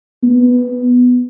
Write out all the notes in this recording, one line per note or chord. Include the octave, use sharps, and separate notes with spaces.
B3